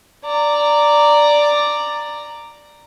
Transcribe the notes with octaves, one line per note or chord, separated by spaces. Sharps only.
D5 A#5